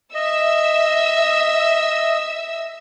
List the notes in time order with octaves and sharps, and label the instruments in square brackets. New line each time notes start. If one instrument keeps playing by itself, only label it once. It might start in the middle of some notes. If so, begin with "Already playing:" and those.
[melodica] D#5 [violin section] E5 E6